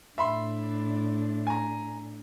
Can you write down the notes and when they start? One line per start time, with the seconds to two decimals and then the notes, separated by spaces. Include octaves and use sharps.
0.18 A2 D4 E5 B5 C6
1.47 G#5 A#5